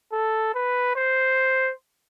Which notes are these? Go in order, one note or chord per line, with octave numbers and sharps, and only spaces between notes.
A4
B4
C5